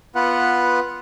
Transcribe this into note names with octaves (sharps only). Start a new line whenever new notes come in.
B3 F4 B4 F#5